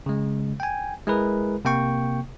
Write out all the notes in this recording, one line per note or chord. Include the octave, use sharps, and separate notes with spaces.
C#3 G#3
G5 G#5
G#3 E4 G#4 A#4 B4
C3 A#3 G5 C#6